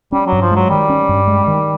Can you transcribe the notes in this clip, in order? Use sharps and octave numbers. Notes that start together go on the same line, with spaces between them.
G3 C#4
F#3
G2
F3
F#3 G#3
D#3 G3
C#4
G2
G#3
D#3